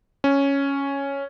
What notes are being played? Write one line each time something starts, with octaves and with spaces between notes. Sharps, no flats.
C#4